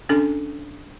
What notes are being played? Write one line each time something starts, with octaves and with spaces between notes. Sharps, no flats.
C#4 D4 A4